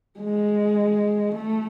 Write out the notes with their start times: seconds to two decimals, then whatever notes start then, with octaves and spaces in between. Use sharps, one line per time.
0.19 G#3
1.35 A3